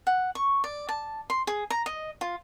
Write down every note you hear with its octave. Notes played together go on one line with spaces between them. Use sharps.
F#5
C#6
D5
A5
C6
G#4
A#5
D#5
F4